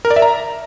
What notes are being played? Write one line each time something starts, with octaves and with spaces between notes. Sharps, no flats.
A#4
D5
E5
A#5